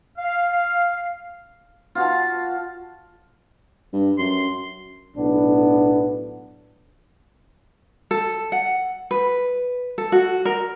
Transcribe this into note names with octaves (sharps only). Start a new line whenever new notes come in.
F5
F4 F#4 A5
G2
F#2 C6
B1 A2 B3 D4
A4
F#5
B4
A4
F#4
A#4